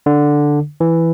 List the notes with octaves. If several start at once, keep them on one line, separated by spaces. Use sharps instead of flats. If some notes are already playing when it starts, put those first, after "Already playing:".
D3
E3